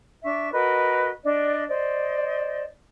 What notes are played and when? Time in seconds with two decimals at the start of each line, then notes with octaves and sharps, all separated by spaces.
0.24 D4 E5 C#6
0.53 F#4 A#4 B4 D#5
1.24 D4 D5 D#5
1.68 C5 D5 D#5